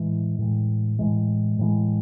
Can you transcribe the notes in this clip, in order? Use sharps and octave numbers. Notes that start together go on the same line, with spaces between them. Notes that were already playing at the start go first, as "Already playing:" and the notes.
Already playing: A2 E3 G#3
A2 E3 G#3
A2 E3 G#3
A2 E3 G#3